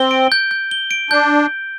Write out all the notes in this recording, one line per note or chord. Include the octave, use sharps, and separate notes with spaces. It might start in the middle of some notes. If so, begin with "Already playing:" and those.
Already playing: C4 G7
D7
G6
G6
G7
D7
D4 G6